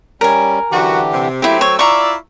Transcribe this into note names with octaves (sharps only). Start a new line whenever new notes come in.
G3 C#4 A#4 G#5
F#2 D3 E3 F#4 G4
C3
F#3 A3 A#3 C4 E4 G4
C#5 E6
E4 F4 D5 A#5 C#6